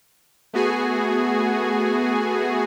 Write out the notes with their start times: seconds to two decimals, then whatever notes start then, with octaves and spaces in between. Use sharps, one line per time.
0.53 A3 B3 F#4 G#4 G#5